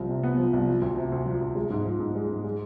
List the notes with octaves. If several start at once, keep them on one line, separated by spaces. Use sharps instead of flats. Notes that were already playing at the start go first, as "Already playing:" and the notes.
Already playing: C2 F3
C3
B3
F3
C2
F3
D2
C3
D2
F3
D2
G#3
G#2
F3
G#2
G#3
G#2
G#3